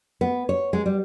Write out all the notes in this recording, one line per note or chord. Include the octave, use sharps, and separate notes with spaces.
B3
C#5
G#3
G3